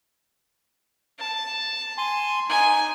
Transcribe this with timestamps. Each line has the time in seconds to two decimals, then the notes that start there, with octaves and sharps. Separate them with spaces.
1.19 A5
1.98 G#5 C6
2.50 D#4 G#5